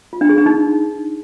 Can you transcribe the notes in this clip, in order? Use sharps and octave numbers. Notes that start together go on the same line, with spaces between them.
F4
D4
G#4
D4
D#4